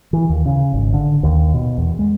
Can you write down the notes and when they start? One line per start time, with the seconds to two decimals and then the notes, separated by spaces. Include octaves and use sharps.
0.13 E3
0.29 D#2
0.46 C#3
0.74 G#1
0.94 D3
1.23 D#2
1.54 B2
1.78 E2
1.99 G#3